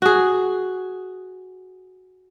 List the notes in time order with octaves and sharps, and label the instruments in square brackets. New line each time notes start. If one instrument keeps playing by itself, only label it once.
[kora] F#4 G#4